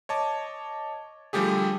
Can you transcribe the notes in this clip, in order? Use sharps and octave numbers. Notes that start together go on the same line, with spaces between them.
C#5 D#5 A5 D6
D3 F3 G3 A3 G4 G#4